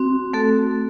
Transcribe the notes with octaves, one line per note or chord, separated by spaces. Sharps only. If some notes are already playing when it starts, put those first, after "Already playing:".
Already playing: C4 F#4
A3 F#4 A4